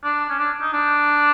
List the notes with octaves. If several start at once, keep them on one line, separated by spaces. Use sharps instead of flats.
D4
C#4
D4
D#4
D4